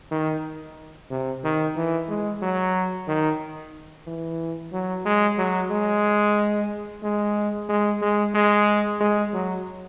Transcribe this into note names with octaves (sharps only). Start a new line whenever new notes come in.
D#3
C3
D#3
E3
G#3
F#3
D#3
E3
F#3
G#3
F#3
G#3
G#3
G#3
G#3
G#3
G#3
F#3